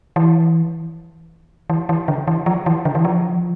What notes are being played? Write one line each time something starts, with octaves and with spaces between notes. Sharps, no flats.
E3
E3
E3
D3
E3
F3
E3
D3
E3
F3